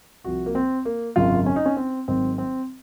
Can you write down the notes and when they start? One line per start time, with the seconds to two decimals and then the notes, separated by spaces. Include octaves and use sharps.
0.24 C2 C3 F3 F#4
0.46 A#3
0.55 C4
0.85 A#3
1.16 G#1 F#2 C#3 F#3 F4
1.46 C#4
1.56 D#4
1.65 C#4
1.76 C4
2.08 G#1 G#2 D#3 F#3 C4
2.38 C4